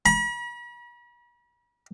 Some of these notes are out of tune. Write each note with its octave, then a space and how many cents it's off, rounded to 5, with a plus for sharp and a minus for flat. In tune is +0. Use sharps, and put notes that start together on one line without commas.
B5 -45